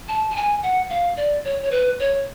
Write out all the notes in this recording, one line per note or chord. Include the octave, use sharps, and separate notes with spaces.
A5
A5
G#5
F#5
F5
D5
C#5
C#5
B4
C#5